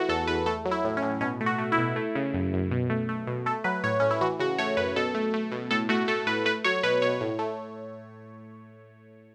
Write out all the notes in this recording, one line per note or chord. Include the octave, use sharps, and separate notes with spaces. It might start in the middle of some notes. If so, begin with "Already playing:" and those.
Already playing: E3 A3 F#4
E2 A4
E2 B4
A3 A4
F#3
E4
A2
C#4
A2
B2 C#4
A3
F#4
A3
E4
B2
A3
C#3
F#2
F#2
B2
A3
A3
B2
A3 A4
F#3 B4
A2 C#5
A2 C#4
E4
E3 F#4
C#3 F#4
A3 C#5
F#2 B4
B2 A4
A3
A3
B2
A2 A4
A3 F#4
A3 A4
A2 B4
A3 B4
F#3 C#5
B2 B4
B2 C#5
A2
A3